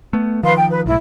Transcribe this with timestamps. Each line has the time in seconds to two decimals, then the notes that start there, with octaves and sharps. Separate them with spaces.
0.13 A3 B3
0.43 D#3 F3 B4 F5 C6
0.56 G5
0.70 B4
0.86 B1 A2 E4